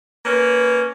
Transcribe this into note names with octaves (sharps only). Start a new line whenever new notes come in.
A#3 C#4 B4